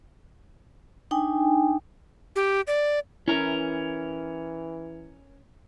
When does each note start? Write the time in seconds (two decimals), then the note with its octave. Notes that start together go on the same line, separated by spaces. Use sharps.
1.11 D4 D#4 G5 G#5
2.36 G4
2.67 D5
3.28 E3 C#4 E4 A#4